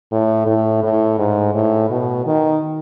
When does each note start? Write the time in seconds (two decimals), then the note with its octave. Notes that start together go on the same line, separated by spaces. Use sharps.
0.12 A2
0.46 A2
0.83 A2
1.19 G#2
1.54 A2
1.90 B2
2.26 D#3